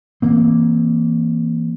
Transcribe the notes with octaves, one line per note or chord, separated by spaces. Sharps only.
E3 A#3 C4